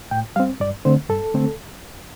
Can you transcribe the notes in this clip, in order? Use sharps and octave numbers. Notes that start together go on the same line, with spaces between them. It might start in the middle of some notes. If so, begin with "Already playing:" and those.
A2 G5
G3 C4 F5
G2 D5
D3 A3 C4 C5
G2 A4
D3 A3 C4